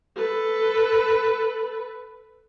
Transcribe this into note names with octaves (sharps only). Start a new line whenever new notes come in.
A4 B4